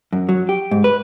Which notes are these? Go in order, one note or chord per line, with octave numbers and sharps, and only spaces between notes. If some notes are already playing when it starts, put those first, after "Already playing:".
F#2
F#3
G4
G#2
B4